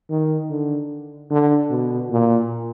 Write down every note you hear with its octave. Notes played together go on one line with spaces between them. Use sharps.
D#3
D3
D3
B2
A#2